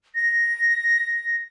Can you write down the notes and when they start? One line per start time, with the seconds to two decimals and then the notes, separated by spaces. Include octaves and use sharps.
0.15 A#6